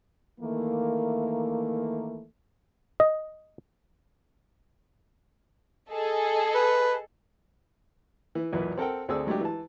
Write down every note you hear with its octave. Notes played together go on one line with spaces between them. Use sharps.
D#3 E3 A3 A#3
D#5
G#4 A4 D#5
B4
E3
B1 E2 A#2 B4
C4 A4 A#4 F#5 G5
D2 C4 G#4 A4 D5 E6
F#3 G#3 A3 D4 G4
E3 A5